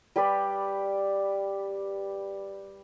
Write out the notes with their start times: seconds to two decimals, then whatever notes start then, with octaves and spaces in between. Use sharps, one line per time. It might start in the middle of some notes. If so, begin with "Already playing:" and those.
0.16 G3 G4 B4 D5